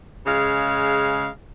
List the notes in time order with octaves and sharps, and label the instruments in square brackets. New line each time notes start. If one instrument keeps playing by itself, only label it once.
[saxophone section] C#3 G#3 F5